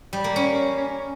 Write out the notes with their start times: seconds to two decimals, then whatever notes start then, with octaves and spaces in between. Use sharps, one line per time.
0.13 G3
0.24 A#3
0.36 C#4